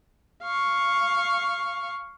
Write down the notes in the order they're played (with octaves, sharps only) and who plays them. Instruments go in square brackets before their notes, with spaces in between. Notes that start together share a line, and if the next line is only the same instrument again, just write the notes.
[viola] F5 C#6